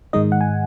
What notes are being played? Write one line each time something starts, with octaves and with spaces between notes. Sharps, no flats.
G#2 D#3 G#3 D#4 D#5
F#5
G#5